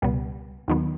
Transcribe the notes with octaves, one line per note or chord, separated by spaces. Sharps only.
C#2 B2 G3 B3
D#2 D#3 F#3 B3